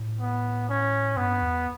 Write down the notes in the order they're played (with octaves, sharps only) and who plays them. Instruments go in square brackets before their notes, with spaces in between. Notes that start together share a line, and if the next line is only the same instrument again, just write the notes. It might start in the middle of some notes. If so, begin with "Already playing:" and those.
Already playing: [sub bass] A2
[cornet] B3
C#4
[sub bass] G2 [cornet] B3
[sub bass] E2